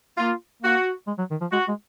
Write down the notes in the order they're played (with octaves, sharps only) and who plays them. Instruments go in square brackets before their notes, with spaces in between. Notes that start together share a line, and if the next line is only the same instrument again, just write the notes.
[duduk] A#3 [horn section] F4
[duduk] A#3 [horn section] F#4
[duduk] G#3
F#3
D#3
F3
[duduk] G#3 [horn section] F#4
[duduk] G#3